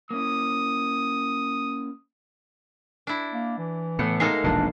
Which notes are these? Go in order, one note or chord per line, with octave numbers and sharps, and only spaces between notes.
A#3 C#4 E4 D#6
D4 E4
A#3
E3
A2 A3 B3 C#7
G#3 A#3 D#4 A4 C7
E1 A#1 A#2 D4